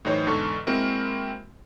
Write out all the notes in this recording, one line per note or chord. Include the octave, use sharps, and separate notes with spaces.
A2 E3 F#3 D#4 C5 C#5
E2 G#2 D3 A4 C#6
G#3 A#3 C4 E4 F#4 A#4